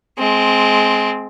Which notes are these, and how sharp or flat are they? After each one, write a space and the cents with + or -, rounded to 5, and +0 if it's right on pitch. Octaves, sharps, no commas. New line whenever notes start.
G#3 +25 C4 +0